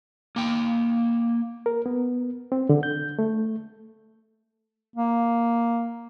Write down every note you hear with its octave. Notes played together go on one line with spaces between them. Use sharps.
A#3 G5
A#4
B3
C4
D3
G6
A3
A#3